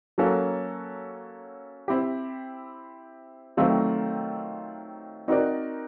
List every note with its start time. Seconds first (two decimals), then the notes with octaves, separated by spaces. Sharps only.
0.18 F#3 A#3 C#4 F#4 A4
1.88 C4 E4 G4
3.57 D#3 F#3 A3 C4 F4
5.28 C4 D#4 F#4 A#4 D5